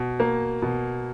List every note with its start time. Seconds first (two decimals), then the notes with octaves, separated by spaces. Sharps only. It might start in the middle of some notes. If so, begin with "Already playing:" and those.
Already playing: B2
0.20 A#3
0.62 B2